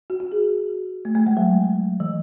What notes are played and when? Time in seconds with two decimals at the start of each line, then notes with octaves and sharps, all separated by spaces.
0.10 F#4
0.20 F#4
0.32 G#4
1.05 A3
1.15 A3
1.27 G#3
1.37 F#3
2.00 E3